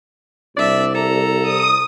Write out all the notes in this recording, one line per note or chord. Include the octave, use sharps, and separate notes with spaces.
C2 D4 D5 E5
A4 A#5
D#6